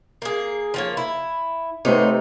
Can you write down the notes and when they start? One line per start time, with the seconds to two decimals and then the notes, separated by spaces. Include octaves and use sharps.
0.22 A#3 G#4
0.74 F3 A#3 C#5
0.97 E4
1.85 C3 A3 B3 D#4 C5 C#5